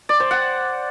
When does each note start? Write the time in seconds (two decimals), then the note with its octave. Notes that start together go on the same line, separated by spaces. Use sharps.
0.09 D5
0.20 C5
0.31 F#5